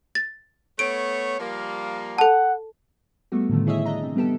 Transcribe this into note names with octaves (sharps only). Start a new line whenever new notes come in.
A6
A3 B3 C#5 D7
F3 G3 A#3
A4 F#5 A5
G3 A3 B3 F#4
A2 D3 D#3 F3 A3
E4 G#4 C#5 D#5 E5
D4 D#5 A#5
C3
G3 B3 G4 A4